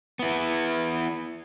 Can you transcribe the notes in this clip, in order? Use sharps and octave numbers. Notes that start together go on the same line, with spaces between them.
B3 E4